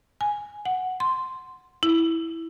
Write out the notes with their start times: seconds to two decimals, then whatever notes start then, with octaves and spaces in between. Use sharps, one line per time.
0.21 G#5
0.65 F#5
1.00 C6
1.83 E4